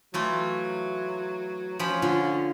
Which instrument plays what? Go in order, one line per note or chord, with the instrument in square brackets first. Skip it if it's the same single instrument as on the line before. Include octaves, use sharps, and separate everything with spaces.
[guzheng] E3 A3 F4 [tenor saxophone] F#3
[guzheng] F3 G5 B5 [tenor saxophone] C#4
[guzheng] D3 [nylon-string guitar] F4